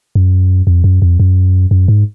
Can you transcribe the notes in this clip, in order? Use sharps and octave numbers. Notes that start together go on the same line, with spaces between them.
F#2
F2
F#2
F2
F#2
F#2
G#2